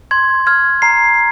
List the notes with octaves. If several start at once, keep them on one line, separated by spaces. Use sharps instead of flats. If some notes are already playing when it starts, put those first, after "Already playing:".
C6 G#6
F6 G#6
A#5 C7